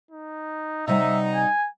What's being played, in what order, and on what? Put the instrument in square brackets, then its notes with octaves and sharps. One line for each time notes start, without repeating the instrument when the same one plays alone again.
[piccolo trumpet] D#4
[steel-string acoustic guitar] C3 G3 F#5 [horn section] D#4 [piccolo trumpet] E5
[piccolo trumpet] G#5